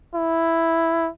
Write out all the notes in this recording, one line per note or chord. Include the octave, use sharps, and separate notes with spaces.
E4